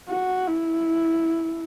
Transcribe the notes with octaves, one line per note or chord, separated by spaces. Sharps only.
F#4
E4